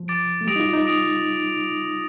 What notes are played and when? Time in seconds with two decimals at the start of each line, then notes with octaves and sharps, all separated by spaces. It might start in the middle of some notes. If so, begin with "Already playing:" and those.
Already playing: F3
0.08 D6 A6 D7
0.41 A3
0.47 G3 D#6 A#6 D7 F7
0.56 D#4
0.60 F4
0.73 D#4
0.86 D#6 A#6 D7 F7